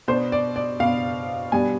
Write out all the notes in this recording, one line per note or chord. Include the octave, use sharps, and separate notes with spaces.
B2 B3 D4 C5
D5
D5
B2 B3 D4 F5
B2 G3 B3 D4 G#5